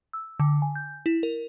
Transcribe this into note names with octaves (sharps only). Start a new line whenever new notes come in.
E6
D3
G#5
G6
E4
A#4